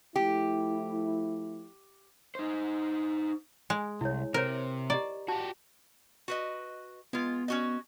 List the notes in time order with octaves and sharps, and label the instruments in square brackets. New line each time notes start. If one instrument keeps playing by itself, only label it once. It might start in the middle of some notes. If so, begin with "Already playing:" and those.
[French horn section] F3 A3 E4 [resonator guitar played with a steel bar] G4
[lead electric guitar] D#4 C5
[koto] G#3 [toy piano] G#5
[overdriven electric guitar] C2 [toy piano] E4 C#5
[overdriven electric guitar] C3 [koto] A#4 [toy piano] C5 C#5
[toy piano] G4 D#5 A#5 [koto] D5
[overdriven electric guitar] F#4 G4 [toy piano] A5
[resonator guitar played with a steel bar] F#4 B4 D#5
[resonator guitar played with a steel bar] G#3 F4 [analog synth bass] B3
[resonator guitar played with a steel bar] C#4 F#4 D#5